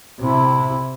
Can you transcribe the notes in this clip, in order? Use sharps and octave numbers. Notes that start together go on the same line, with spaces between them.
C3 E4